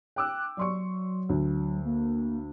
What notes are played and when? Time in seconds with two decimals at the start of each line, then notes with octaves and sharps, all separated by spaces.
0.16 G5 D6 E6 F#6
0.57 F#3 D5 C6 C#6
1.29 D2
1.85 A#3